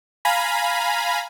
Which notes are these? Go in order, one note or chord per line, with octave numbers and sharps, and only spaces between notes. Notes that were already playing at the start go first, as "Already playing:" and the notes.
F5 G#5 A#5 B5